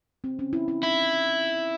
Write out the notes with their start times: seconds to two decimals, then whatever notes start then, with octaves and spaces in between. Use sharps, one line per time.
0.24 C4
0.39 C#4
0.53 E4
0.68 E4
0.83 D#4 E4